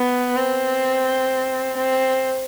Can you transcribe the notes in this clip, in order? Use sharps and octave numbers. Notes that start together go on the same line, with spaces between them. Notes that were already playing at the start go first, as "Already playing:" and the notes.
Already playing: B3
C4
C4